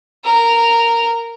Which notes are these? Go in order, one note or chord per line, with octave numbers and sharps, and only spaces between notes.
A#4